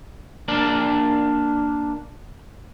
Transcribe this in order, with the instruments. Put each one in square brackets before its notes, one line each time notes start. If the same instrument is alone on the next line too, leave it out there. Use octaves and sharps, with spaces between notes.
[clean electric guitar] A#3 D4 D5